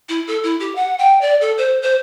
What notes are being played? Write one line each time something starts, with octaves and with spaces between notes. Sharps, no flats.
E4
A4
E4
G4
F#5
G5
D5
A4
C5
C5